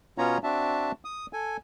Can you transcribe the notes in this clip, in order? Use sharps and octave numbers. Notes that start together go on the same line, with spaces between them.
B2 B3 C#4 F4 C#5 A#5
C4 D4 F#4 E5 A5
D#6
A4 G#5